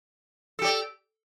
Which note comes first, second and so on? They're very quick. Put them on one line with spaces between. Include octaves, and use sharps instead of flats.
A4 G4 D5